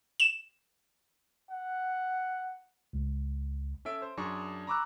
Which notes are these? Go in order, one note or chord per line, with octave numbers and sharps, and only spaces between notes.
E7
F#5
C#2
C#4 A4 E5 D7
C5
F#2 D4 G#4 C#6 C#7
A#5 B5 C#6 D6 E6 F#6